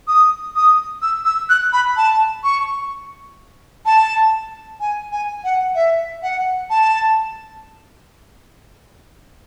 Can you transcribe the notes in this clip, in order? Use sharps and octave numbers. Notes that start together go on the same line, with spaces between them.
D#6
D#6
E6
E6
F#6
B5
A5
C#6
A5
G#5
G#5
F#5
E5
F#5
A5